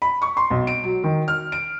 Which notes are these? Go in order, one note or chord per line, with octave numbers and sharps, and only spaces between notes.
B5
C#6
C6
B1
D7
F#3
D#3
F6
D7